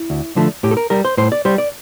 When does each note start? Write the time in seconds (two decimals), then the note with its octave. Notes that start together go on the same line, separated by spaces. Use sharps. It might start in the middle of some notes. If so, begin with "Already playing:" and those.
Already playing: E4
0.10 D2
0.36 D3 F3 A3
0.63 A2 G4
0.71 A4
0.77 A#4
0.90 G3 A#4
1.05 C5
1.17 A2 C5
1.32 D5
1.45 G3 C5
1.58 D5